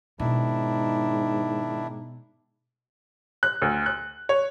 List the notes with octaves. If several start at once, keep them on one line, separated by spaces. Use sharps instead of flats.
G#2 B2 D#3 D4 E4
F#6
D2
F#6
C#5